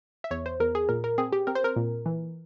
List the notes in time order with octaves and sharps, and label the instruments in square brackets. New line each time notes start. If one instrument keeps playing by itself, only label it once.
[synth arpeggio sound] E5
E2 C#5
C5
E2 A#4
G#4
A#2 A#4
A#4
C4 G#4
G4
C4 A#4
C5
A#4
A#2
E3